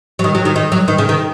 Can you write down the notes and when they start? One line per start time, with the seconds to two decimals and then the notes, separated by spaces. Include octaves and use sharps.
0.19 F#3
0.24 D#3
0.35 F#3
0.45 D#3
0.56 D#3
0.72 F#3
0.88 D#3
0.98 C#3
1.09 D#3